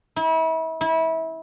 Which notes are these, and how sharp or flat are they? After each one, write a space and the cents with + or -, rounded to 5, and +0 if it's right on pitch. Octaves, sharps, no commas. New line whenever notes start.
E4 -35
E4 -25